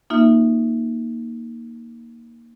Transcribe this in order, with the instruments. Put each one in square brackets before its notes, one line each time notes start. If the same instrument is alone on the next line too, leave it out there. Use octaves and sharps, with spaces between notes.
[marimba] A#3 D#4 F4 E5